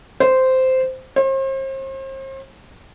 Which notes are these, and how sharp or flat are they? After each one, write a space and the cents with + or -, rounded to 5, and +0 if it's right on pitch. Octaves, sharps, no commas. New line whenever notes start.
C5 -10
C5 +40